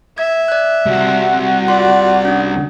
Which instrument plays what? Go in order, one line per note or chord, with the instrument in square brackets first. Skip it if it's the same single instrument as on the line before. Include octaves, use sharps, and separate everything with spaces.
[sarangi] E5 [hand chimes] G#6
[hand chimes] D5 F#6
[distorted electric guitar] C2 [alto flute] F#4
[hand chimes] F4 C6 [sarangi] D5
[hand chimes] C#4 D4